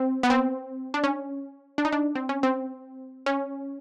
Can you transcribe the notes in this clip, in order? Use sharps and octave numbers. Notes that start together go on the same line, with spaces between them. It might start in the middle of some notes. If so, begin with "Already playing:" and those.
Already playing: C4
B3
C4
D4
C#4
D4
D#4
D4
C4
C#4
C4
C#4